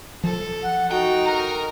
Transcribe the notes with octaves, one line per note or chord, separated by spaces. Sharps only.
F3 A4
F#5
D#4 F#4 G5
A#4 A#5